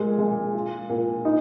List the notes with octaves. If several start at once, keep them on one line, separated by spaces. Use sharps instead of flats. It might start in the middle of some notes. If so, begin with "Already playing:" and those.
Already playing: A#2 G#3
G#3
F4
A#2
D#4